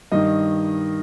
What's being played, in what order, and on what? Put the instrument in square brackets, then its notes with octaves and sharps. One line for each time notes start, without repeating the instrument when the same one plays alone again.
[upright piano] G2 D#3 D#5